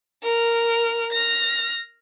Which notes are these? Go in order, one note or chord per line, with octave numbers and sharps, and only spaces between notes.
A#4 F6
F6 A#6